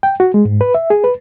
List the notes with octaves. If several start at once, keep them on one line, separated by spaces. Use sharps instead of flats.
G5
F#4
G#3
G#2
B4
E5
G#4
B4